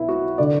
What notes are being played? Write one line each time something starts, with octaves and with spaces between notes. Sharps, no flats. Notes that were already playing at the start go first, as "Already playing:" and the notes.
Already playing: B1 B2 E4 B4
F#4
D3 D5